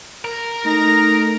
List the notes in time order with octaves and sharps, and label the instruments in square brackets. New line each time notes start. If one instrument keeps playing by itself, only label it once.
[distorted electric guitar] A#4
[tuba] A3 [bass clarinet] D#4 [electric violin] A#6